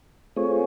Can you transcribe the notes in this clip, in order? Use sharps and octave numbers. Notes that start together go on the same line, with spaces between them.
A3 C4 F4 G#4 C#5